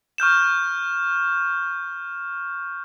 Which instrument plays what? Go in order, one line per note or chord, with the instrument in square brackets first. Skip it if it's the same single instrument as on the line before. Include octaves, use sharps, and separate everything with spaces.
[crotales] C#6 F6 G6 E7